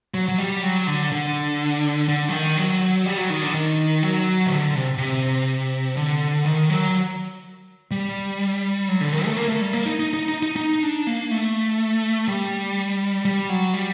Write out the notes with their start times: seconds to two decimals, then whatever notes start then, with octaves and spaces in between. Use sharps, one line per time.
0.14 F#3
0.29 F#3
0.38 G3
0.63 F#3
0.87 D3
1.12 D3
2.08 D3
2.29 F#3
2.32 D#3
2.57 F#3
3.06 G3
3.17 F#3
3.30 D#3
3.42 D3
3.54 D#3
4.03 F#3
4.46 D#3
4.51 D3
4.75 C3
4.98 C3
5.97 D3
6.46 D#3
6.70 F#3
7.91 G3
8.88 F#3
9.01 D3
9.13 D#3
9.25 A3
9.37 A#3
9.48 A3
9.62 G3
9.73 A#3
9.86 D#4
10.00 D#4
10.14 D#4
10.28 D#4
10.43 D#4
10.56 D#4
10.83 D4
11.07 A#3
11.31 A3
12.28 G3
13.25 G3
13.49 F#3
13.74 G3